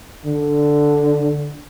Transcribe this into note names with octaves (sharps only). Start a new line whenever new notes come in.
D3